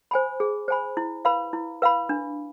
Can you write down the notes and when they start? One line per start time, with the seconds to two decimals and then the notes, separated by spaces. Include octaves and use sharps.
0.11 C5 G#5 B5
0.40 G#4
0.68 C5 G#5 B5
0.97 E4
1.25 B4 F5 B5
1.53 E4
1.82 B4 F5 B5
2.09 D4